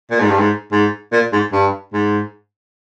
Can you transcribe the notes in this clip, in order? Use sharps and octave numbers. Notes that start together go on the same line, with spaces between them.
A#2
G#2
G2
G#2
G#2
A#2
G#2
G2
G#2